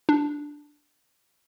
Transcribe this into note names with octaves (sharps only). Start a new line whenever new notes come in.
D4